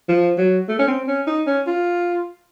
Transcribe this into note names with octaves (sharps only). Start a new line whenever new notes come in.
F3
F#3
A3
C#4
C4
C#4
D#4
C#4
F4